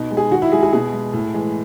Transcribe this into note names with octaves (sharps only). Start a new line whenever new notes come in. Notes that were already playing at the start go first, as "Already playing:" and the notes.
Already playing: B2 D#4
G#3
G#4
D#3 F#4
E4
G#3 G#4
G#4
B2 G#4
G#3
A2
E3 G#3